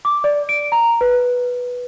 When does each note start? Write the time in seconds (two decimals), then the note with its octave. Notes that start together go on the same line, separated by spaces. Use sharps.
0.05 D6
0.24 D5
0.49 D7
0.72 A#5
1.01 B4